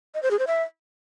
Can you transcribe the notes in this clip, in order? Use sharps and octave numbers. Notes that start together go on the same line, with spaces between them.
D#5
C5
G#4
C5
E5